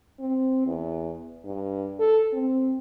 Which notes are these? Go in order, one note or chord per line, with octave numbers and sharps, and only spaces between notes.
C4
E2
G2
A4
C4